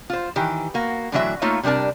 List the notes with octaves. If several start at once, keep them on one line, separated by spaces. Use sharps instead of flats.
F4 C5
D#3 E3 G4
A#3 F#4
A2 D3 E3 F#3 F4 E5
A3 A#3 D#4 F4 C#5 E5
C3 G3 D4 A#4 A5